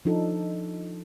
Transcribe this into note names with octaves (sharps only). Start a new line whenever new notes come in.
F3 D4 D#4 A4